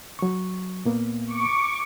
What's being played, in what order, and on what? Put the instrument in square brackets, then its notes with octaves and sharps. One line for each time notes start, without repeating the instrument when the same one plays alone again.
[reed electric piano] F#3 C#6
A#2 A#3 B3
[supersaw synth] C#6 D6